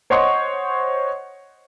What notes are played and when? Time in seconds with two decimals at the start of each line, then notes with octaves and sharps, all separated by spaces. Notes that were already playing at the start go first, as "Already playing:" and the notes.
0.10 C5 C#5 D#5 F#5 C6 C#6